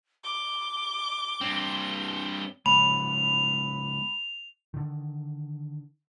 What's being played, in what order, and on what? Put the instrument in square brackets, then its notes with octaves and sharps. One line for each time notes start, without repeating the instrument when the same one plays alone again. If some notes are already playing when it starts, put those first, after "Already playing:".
[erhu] D6 [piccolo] G7
[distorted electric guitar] G2 C4
[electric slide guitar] C#3 G#3 B3 [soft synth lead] B5 [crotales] F7
[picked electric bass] D3 D#3